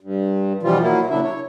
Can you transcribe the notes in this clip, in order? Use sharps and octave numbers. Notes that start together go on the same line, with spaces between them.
G2
B2 E3 F3 G3 F4
F#3 A#3 E4
A#2 C#3 F#3 D4 E4 E5
C#5